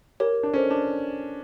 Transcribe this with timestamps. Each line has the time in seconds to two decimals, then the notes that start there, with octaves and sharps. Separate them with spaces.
0.20 G4 A#4 C#5
0.43 D4
0.54 C#4 A4 C5 D#5
0.71 D4